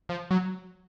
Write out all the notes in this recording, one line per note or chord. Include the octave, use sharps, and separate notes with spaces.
F3
F#3